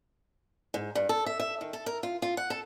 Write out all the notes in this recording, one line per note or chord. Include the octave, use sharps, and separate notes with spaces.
G#2
G2
A4
E5
E5
D#3
A4
A#4
F4
F4
F#5
A4